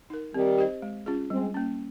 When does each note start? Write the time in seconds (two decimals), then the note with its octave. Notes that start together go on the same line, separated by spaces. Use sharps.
0.10 D#4 A#4
0.34 D#3 G3 C4
0.58 G4 C5 D#5
0.82 G#3
1.06 C#4 F4 G#4
1.30 G3 G#3 C4
1.54 A#3 C#4